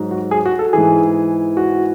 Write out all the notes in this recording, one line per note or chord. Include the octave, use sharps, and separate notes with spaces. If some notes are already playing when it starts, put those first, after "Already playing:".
Already playing: G#2 F#3
F#4
G#4
F#4
A4
G#2 E3 G#4
F#4